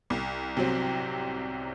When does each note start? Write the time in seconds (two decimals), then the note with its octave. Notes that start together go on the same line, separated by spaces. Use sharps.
0.10 C2
0.57 C3 F#3 C4